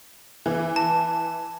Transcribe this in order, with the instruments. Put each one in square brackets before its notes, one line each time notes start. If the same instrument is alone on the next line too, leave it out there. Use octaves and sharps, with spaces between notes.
[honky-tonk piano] E3
[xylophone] A5